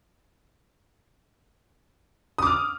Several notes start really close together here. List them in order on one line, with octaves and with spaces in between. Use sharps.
D#6 D6 F6